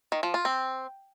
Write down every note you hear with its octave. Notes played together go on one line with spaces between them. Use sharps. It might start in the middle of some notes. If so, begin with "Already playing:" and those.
D#3
F3
F4
C4